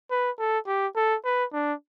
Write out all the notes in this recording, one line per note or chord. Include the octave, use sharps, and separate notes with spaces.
B4
A4
G4
A4
B4
D4